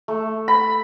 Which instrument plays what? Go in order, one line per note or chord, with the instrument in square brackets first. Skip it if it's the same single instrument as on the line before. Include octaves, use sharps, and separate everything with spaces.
[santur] A3
B5